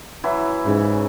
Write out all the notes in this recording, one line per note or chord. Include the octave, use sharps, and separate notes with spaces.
E3 F#3 E4
G#2 C#3